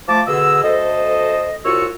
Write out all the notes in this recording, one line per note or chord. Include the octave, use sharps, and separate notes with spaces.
F3 A3 F4 A5 D6
B2 D3 G#4 D#5 E6
D2 A4 C5 D#5
C2 F4 F#4 C#5 C#6 E6